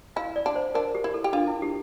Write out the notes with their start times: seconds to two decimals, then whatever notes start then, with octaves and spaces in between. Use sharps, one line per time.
0.16 E4 F5
0.36 D5
0.46 D4
0.55 C5
0.75 D4 A#4
0.95 G4
1.04 E4
1.14 A4
1.24 G4
1.33 D4 F4
1.47 E4
1.62 G4